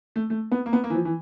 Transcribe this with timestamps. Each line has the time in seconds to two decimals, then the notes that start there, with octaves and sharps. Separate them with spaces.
0.16 A3
0.30 A3
0.52 B3
0.66 A#3
0.73 B3
0.84 A#3
0.90 E3
0.94 F3
1.05 E3